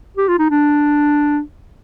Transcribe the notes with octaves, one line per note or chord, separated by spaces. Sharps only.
G4
F4
D#4
D4